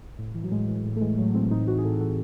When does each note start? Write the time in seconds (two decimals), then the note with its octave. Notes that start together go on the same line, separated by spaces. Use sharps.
0.18 A2
0.35 E3
0.43 F#3
0.51 A2 G#3
0.68 E3
0.85 A2
0.96 A3
1.01 E3 G#3
1.18 A2 F#3 A3
1.34 E3 G#3 C4
1.51 A2 C4 D#4
1.67 E3 D#4 F#4
1.78 G#4
1.84 A2 F#4 A4
2.00 E3 F#4 A4